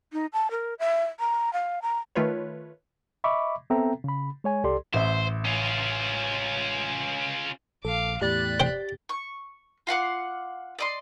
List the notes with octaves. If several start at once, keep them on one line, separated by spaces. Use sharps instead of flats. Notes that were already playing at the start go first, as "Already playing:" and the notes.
D#4
A5
A#4
E5
A#5
F5
A#5
D#3 A3 F4 B4 C#5
D#5 E5 B5 C#6 D6
B3 C4 A4 E5 G5 A#5
C#3 B5
G#3 C#5 G#5
C2 G4 A4 D5 C6
A1 C5 E5
C#4 F4
A#1 A4 F5 D6
E2 A2 G4 D5 B5 F#6 A6
C5 G5
C#6
F4 F5 F#5 D6
D5 D#5 C6